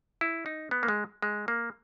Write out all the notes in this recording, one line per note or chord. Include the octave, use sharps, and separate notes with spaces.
E4
D#4
B3
A#3
G#3
G#3
A#3